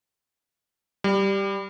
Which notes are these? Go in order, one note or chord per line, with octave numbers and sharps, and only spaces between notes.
G3